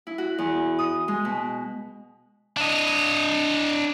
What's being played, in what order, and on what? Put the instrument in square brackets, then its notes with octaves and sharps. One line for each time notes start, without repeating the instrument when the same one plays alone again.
[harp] E4
F#4
E2
D#6
G#3
B2
[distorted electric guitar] D4 D#5